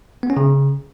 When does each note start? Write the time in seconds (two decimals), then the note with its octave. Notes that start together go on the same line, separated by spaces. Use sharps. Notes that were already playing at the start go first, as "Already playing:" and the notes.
0.23 B3
0.30 C#4
0.37 C#3